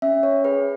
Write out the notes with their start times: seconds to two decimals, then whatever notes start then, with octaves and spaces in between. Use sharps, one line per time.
0.02 C#4 E5
0.23 C#5
0.44 G#4 B4